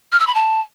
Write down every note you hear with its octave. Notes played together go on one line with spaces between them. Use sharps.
F6
E6
B5
A5